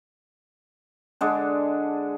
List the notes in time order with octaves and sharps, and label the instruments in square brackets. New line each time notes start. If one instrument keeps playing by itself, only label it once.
[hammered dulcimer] D3 G#3 D4